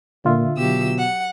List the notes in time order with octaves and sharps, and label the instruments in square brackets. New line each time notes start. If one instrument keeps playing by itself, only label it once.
[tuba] A#2 [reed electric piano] D3 F4 E5
[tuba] B2 [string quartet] F#3 G4 E6
[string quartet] F#5